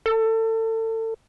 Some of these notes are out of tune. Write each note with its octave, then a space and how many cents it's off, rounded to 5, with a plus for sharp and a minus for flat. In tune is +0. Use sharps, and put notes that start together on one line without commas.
A4 +30